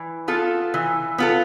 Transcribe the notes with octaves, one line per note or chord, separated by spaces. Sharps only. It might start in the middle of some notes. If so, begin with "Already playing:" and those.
Already playing: E3
B3 F4 A4
E3
B3 F4 A4